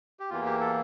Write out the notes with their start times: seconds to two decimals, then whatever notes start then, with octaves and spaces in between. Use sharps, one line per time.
0.20 G4
0.30 E2 E3 A#3 F4
0.45 G4
0.60 A4